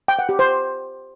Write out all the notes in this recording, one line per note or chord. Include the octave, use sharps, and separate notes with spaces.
G5
F#5
G4
C5